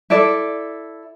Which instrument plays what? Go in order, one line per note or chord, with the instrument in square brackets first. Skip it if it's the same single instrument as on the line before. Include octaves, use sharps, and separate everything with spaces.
[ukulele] E4 A4 D5